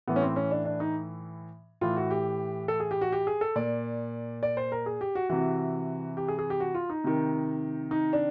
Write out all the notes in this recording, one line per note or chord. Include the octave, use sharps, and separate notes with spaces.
A2 E3 B3
C#4
C4
C#4
D4
D4
D#4
A2 E3 F4
F#4
G4
A4
G#4
G4
F#4
G4
G#4
A4
A#2 D5
D5
C5
A#4
G#4
G4
F#4
C3 E3 F#4
G4
G#4
G#4
G4
F#4
F4
D#4
C3 D#3
D#4
D4